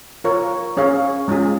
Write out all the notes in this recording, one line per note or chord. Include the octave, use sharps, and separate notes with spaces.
F4 A#4 C#5
C#4 G#4 C#5 F5
G#3 C#4 F4 G#4